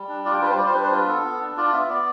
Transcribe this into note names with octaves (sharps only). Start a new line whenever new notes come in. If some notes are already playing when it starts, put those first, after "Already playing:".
Already playing: G3
D4
F4 D5
G5
G3 B4
C5
G3 D5
C5
D4 B4
C5
F4 B4
B3 A4
B3
D4
F4 D5
B3 E5
B3 D5